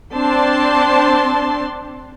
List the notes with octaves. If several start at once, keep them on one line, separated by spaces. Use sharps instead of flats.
C4 D4 A5 C6